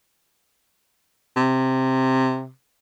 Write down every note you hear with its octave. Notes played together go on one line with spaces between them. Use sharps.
C3